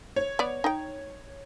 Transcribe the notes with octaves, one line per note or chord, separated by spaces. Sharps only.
C#5
B3 D5
D#4 G5